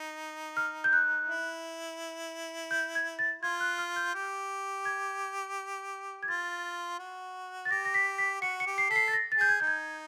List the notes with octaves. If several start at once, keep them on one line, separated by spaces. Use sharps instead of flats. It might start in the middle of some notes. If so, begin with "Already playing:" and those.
Already playing: D#4
F6
G6
F#6
E4
G6
G#6
A6
F4 G#6
F#6
F6
G6
G4
G#6
G#6
F4 A6
F#4
A6
G4 A#6
A#6
B6
B6
F#4 C#7
C#7
G4
C7
A4 B6
C7
A6
A#6
A6
G#4 G6
G#6
D#4 G6
G#6